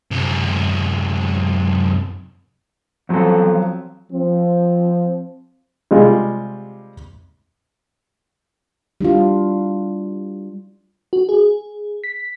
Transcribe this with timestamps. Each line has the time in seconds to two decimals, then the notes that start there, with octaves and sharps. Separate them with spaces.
0.11 F#2 C3
3.09 E2 F3 F#3 C4 A4
4.12 F3 C4
5.91 C3 G3 G#3 F4
9.01 G3 D4 E4 F4
11.13 F#4
11.29 G#4
12.04 B6